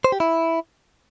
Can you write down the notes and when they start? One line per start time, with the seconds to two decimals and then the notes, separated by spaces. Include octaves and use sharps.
0.04 C5
0.12 G4
0.20 E4